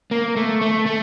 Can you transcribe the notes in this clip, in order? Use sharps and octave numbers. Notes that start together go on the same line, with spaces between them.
A#3
A3
A3
A3